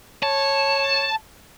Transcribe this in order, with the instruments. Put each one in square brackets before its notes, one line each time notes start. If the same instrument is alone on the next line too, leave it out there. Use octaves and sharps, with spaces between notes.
[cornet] C#5 [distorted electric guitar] A5